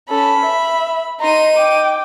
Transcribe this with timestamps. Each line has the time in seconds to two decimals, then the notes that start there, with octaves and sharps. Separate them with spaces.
0.10 C#4 A4 B5
0.45 E5
1.21 D#4 A#5 C6 D#7
1.57 G5 D6